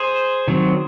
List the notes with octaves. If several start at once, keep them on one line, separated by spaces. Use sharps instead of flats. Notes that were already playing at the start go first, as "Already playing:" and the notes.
Already playing: G#4 C5
D#3 F#3 C4